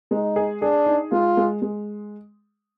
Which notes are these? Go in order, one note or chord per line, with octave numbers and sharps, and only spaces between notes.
G#3 D#4
G#4
D4 G#4
D#4
G#3 F4
G#3
G#3